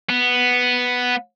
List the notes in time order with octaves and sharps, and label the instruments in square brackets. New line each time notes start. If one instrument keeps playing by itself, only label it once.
[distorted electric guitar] B3